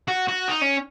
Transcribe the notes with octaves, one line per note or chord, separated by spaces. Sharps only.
F#4
F#4
D#4
C#4